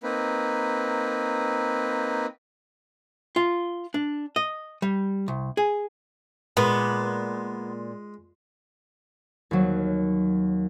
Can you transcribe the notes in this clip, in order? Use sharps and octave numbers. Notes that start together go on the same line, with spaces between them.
A#3 C4 D#4 B4
F4
D4
D#5
G3
C2
G#4
A#2 G#3 B3
D#2 F#3